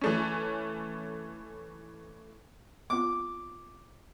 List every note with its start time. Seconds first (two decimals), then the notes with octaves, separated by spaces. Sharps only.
0.01 E3 A3 C#4
2.90 B3 C4 F4 D6